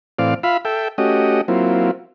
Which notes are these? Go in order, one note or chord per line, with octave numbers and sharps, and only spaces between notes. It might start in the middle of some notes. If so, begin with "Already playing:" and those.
A2 E3 C4 D5 F5
F4 E5 F5 B5
A4 E5 G5
A3 C#4 F#4 G4 D#5
F#3 A#3 C4 E4 F4